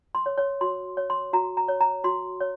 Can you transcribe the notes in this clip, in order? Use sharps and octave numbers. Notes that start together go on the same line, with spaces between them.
C6
C#5
C#5
F#4 C6
C#5
C6
F#4 A#5
A#5
C#5
A#5
F#4 C6
C#5